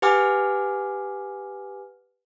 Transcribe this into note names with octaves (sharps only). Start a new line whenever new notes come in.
G4 B4 F#5 G#5 D6 F6